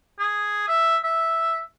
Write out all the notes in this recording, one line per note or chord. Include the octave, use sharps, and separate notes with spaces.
G#4
E5
E5